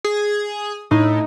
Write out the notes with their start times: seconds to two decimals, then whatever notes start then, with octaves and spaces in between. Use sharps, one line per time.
0.04 G#4
0.91 A2 D#4